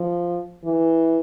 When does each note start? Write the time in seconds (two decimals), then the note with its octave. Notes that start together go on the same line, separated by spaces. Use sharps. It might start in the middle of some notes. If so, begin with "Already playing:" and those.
Already playing: F3
0.64 E3